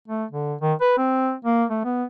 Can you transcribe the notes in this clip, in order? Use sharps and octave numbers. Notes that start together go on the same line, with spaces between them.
A3
D3
D#3
B4
C4
A#3
A3
B3